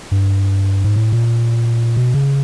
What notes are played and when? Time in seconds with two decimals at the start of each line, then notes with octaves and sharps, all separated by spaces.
0.11 G2
0.84 G#2
0.96 A2
1.12 A#2
1.97 B2
2.14 C#3